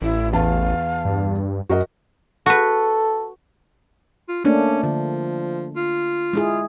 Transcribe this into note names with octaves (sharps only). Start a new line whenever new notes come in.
A1 E4
E2 F5 A5
G2
F#2 F#4 A#4 D#5
F#4 A4 B4
F4
A3 A#3 C#4 D4
D3 F3
F4
G#3 E4 G#4